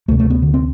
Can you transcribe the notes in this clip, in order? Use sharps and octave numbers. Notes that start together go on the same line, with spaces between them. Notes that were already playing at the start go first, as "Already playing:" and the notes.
D2 C3 A3
A3
B3
D3
C4